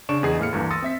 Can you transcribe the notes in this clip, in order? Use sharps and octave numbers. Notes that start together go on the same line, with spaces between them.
C#3 D4 C#6 D7 E7
E2 D4 G#4 D#5 C7
A2 A#3 F6 C#7
D2 G2 E3 A#3
C6 D#6 E6 A6 A#6 C#7
C4 E5 B6